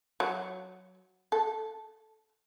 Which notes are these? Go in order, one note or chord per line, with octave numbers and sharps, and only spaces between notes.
F#3
A4